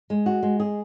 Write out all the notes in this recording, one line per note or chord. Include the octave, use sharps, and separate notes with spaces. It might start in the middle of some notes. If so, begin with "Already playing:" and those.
G#3
F#4
G#3
G#4